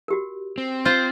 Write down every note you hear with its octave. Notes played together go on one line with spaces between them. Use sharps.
F#4 G4 A#4
C4
F4 C5